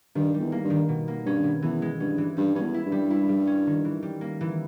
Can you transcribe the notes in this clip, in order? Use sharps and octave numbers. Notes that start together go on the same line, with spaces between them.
G2 D#3
G3
E2
A#3
G2
D#3
B2
A#3
G2 C#4
B2
E2 E3
G#3
G2 C#4
E3
G2 G3
G2 C#4
E2
E4
G2
G3
E4
G3
C#4
D#3
E3
G3
A#3
E3